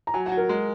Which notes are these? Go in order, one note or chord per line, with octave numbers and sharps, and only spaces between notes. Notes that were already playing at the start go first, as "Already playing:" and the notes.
A#5
F#3 G#5
F#5
F#3
A#4
G#3